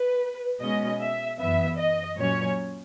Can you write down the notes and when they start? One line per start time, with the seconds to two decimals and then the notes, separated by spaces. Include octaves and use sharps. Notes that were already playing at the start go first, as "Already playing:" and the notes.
Already playing: B4
0.61 B2 G#3 C#4 D#5
1.01 E5
1.39 F#2 E3 B3 E5
1.78 D#5
2.18 A#2 F#3 C#4 C#5